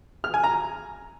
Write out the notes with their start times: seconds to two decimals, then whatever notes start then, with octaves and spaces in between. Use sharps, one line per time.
0.24 F6
0.34 G#5
0.44 A#5